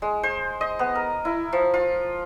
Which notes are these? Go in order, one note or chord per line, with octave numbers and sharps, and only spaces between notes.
G#3
C5
D#5
B3
A#4
E4
F3
F4